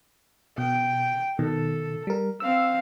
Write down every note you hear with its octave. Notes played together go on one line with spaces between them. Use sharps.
B2 G5
B2 D#3 A4
G3 A#4
C4 F5 E6